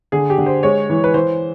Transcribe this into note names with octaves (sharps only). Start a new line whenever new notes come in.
D3 G#4
G4
D3
C5
G#3 C#5
E3
B4
E3 C5